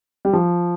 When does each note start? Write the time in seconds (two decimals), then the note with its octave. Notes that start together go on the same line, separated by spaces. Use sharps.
0.25 G3
0.33 F3